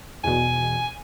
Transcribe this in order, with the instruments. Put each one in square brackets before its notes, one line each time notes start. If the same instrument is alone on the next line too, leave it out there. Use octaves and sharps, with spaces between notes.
[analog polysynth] E2 B2 [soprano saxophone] G#5